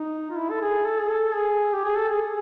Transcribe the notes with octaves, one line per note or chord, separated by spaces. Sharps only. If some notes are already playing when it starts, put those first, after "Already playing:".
Already playing: D#4
F4
E4
A4
G#4
A4
G#4
A4
G#4
G4
G#4
A4
G#4
G#4